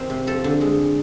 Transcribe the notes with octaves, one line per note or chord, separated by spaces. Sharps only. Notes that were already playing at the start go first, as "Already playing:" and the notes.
Already playing: D#3 G3 C4
C3
F3 A4
D3
G#3